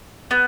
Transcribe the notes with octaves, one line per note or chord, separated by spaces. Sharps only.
B3